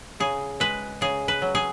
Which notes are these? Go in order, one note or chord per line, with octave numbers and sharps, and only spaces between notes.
C#3 G#4
G#3 B4
C#3 G#4
B4
F#3
G#4